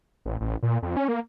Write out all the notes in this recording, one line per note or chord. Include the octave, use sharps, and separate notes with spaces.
A1
A1
A#2
F2
C#4
A#3